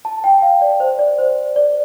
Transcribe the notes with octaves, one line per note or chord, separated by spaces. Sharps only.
A5
G5
F5
D5
C5
D5
C5
D5